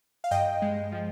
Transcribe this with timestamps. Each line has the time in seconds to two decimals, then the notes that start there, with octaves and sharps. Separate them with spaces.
0.24 F5
0.31 G2 D#5 G5
0.62 G#3
0.92 F3